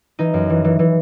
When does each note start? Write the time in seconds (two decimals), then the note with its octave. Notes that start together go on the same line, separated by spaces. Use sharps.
0.19 E3 D#4
0.34 F#2
0.49 E3
0.64 E3
0.79 E3